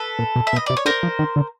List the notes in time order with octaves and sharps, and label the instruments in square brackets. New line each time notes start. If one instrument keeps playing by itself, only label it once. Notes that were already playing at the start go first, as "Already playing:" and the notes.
Already playing: [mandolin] A4 B4
[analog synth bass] A#2
B2
[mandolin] E5
[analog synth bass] B2
[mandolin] D#5
[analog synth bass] C3 [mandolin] D5
[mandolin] C#5
[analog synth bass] D3 [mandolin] A#4 C5
[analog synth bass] F3
D#3
D3